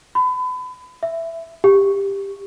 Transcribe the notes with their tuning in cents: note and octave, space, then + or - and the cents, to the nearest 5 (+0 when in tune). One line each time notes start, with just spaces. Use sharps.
B5 +30
E5 +5
G4 +10